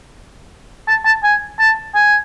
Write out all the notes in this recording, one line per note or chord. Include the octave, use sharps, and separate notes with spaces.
A5
A5
G#5
A5
G#5